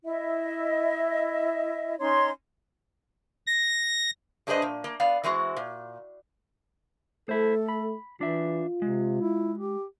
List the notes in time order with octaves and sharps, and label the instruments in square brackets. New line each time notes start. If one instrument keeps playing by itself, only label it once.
[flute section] E4 D#5 E5
C#4 D#4 C#5 C6
[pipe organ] A#6
[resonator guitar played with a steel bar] G2 D4 G#4 B4 C5 D#5
A#2
A#3
B3 D5 F5
E3 G#3 C4 F#4
A#2
[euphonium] A3 [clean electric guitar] E4 C5 [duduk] A4
[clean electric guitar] B5
[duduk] E3 [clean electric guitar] D4 E5 [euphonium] F4
[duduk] C3 [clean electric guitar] G#3
[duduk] E4
G4